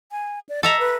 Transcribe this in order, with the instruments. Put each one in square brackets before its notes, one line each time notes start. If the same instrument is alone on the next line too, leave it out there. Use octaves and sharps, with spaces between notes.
[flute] G#5
D5
[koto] A4 E5 A#5 [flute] D#5
[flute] B4